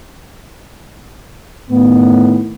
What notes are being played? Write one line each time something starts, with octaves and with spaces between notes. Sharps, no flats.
A2 D#3 B3